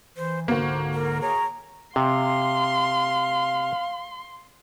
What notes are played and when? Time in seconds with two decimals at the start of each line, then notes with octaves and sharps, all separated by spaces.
0.17 E3 C5
0.48 C#2 G#2 D3 A#3 F#4 C5
0.93 A#4
1.21 G#4 C#5 A#5
1.96 C3 F5 C6